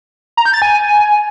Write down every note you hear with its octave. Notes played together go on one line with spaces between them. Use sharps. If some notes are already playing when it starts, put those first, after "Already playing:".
A#5
G6
A6
G#5